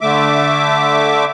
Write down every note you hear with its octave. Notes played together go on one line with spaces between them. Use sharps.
D3 A3 E5 D6